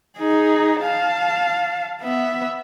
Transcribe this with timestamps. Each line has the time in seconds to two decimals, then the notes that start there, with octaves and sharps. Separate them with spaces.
0.18 D#4 G#4
0.83 F5 A5
2.01 B3 E5